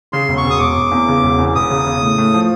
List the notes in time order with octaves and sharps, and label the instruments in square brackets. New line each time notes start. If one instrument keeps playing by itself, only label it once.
[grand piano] C#3 [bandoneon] C6
[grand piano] E1
[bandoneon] C#6
[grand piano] E1
[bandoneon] D#6
[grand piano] E1 [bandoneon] D6
[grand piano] E1
E2
C#3
E1
E2
[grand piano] E1 [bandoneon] D#6
[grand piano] C#3
C#3
A2
A2
F3